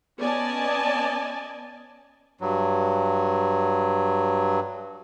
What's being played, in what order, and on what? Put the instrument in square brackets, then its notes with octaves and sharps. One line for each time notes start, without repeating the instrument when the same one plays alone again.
[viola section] B3 C#4 D5 D#5 G#5 A5
[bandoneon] G2 F#3